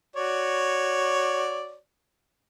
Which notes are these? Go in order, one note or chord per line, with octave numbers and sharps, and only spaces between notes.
F#4 C#5 D5